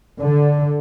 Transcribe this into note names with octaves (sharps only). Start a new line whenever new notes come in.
D3